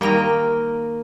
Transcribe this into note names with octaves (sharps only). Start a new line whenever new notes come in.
D#3 G3 A#3 A#4 G5 A#6